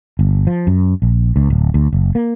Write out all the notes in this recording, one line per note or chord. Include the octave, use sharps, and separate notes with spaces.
G1
F3
F#2
A#1
C#2
D1
D2
F#1
A#3